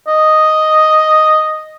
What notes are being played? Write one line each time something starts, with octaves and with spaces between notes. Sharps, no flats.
D#5